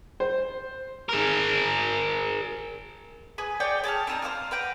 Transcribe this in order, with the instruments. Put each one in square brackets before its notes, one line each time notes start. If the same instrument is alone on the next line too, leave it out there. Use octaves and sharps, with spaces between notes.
[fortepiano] C5
[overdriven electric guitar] G#4 A#4
[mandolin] G#4 B4 G#5
G#4 C#5 D5 G5
G#4 A5 D#6 F6
C4 D#4 A5 A#5
C5 C#5 F5 F6
B4 F#5 G5 A#5